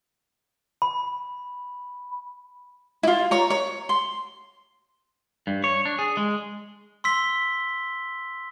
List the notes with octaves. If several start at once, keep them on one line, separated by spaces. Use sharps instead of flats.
B5
E4 F4
C#5 A#5
C#5
C6
G2
C#5
D4
G#4
G#3
C6 E6 B6 G7